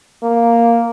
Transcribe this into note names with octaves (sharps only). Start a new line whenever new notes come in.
A#3